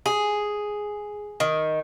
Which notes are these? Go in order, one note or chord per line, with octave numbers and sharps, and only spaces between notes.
G#4
D#3